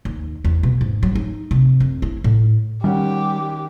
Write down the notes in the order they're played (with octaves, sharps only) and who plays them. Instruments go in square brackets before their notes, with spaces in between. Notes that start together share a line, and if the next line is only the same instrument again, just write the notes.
[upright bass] D#2
E2
B2
G#2
F#3
D#4
C3
F2
E4
A2
[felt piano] D#3 C#4 F#5 [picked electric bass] G3 [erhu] G4